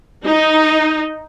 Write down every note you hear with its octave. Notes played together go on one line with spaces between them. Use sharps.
D#4